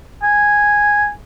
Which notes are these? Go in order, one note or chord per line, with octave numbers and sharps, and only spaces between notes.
G#5